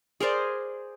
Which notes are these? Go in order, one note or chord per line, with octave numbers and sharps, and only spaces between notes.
G#4 A#4 C5 D5